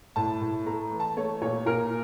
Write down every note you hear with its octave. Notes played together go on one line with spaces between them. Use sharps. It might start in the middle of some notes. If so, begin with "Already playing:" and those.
A2 A5
A2
A3 A#5
E3
A5
A3 C#5
A#2 C#5
A#2 A#4